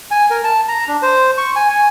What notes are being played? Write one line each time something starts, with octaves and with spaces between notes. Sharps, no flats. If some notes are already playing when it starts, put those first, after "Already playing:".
G#5
A#4
A5
A#5
D4
C5
C#6
G#5
G#5